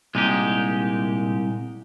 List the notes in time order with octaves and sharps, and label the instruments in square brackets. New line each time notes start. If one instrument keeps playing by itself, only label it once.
[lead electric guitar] C2 [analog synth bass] A#2 [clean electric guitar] G#3 D#4 G4